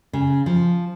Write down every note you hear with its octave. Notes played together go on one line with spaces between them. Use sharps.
C#3
F3